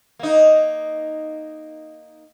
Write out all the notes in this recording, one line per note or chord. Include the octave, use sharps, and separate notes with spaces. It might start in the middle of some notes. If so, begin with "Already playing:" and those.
A#3 D#4